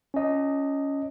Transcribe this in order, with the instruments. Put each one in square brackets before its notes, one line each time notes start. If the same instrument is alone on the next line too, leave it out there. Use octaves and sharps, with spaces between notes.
[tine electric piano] C#4 D#5